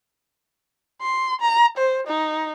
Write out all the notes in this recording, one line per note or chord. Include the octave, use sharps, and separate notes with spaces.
C6
A#5
C5
D#4